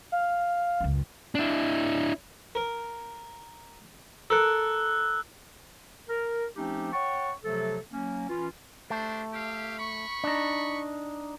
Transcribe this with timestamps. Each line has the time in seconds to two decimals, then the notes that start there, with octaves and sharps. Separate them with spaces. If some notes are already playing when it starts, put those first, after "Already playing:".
0.12 F5
0.80 C#2 F#2
1.35 D4 E4
2.55 A#4
4.30 A4 A#4 E6 F#6
6.08 A#4
6.56 F3 A3 C4 C#4 D#4 G4
6.92 C#5 F#5 G5 A5 C#6
7.43 C3 F3 F#3 A3 A4
7.92 F#3 A#3 C#4
8.28 E3 C#4 F4
8.90 A3 D4 G4 C5
9.34 G4 E5 F5
9.79 B5 C#6
10.24 D4 D#4